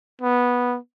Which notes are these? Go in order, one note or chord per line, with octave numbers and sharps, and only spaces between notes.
B3